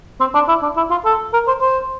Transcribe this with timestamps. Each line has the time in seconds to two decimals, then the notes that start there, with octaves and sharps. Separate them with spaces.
0.20 C4
0.34 D4
0.48 E4
0.62 D4
0.77 E4
0.91 F4
1.05 A4
1.33 A#4
1.47 C5
1.61 C5